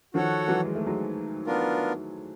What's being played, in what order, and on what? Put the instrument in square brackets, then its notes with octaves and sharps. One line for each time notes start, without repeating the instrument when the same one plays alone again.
[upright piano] D#3 F3 [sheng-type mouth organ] F#4 A4 C#5 F#5
[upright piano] E3 F#3
G#3
A3
F#3 G#3
[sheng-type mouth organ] B3 D4 F4 A#4